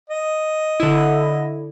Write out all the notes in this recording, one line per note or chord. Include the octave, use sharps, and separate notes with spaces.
D#5
D3 E4